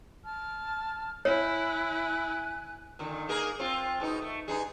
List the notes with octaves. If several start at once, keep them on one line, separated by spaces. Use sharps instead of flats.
A5 F6
E4 C#5 G#5 F#6
A#2 D3 D#3
A#3 G#4 A#4
C4 F4
G#2 B2 D#4
A3
G2 D#4 G#4